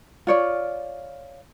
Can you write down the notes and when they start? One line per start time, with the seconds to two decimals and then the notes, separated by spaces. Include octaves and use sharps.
0.27 F4 C#5 D5